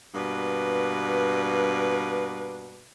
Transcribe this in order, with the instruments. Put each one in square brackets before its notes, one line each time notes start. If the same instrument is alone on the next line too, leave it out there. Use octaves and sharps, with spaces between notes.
[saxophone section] G2 B2 A#3 B4 D5